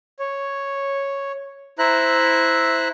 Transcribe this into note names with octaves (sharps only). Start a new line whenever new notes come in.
C#5
E4 C5 E5 A#5 F#6